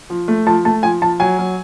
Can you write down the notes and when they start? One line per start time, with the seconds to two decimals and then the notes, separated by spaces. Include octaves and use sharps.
0.10 F3
0.28 A3
0.46 F3 A5
0.65 A3 A5
0.83 F3 G#5
1.02 F3 A5
1.20 F#3 G#5
1.39 F#3